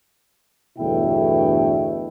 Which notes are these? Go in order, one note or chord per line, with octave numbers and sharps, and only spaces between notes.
G1 E2 B2 A3 E4 G5